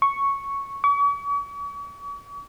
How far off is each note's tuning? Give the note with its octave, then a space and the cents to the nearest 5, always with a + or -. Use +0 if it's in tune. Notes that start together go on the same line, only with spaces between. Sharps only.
C#6 +0
C#6 +45